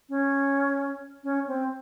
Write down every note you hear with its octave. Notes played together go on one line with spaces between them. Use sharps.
C#4
C#4
C4